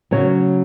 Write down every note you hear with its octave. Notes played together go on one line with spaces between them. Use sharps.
C#3 F#3 C#5